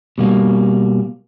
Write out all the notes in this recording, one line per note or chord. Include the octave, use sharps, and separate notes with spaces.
B2 G3 A#3